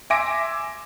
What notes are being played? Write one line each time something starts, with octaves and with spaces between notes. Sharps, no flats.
E5 G#5 C6 D6 A#6 D7